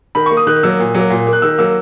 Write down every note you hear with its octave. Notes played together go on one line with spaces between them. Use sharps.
D#3 B5
A#3 C#6
D#6
D#3 F#6
F#3 A#3 E6
A#2
F#3 A#3
A#2
A#3
F#6
D#3 E6
F#3 A#3 E6